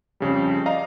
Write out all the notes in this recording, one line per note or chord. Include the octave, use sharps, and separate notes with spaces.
F2 C#3 G3
D5 D#5 F5 A#5